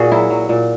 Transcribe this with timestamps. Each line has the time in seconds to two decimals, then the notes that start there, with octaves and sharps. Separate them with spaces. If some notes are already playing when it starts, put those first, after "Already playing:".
Already playing: A#2 F#4 G#4
0.12 F#3 E4
0.30 F#3
0.49 A#2